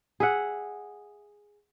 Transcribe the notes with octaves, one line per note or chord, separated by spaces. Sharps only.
G#4 E5 F#5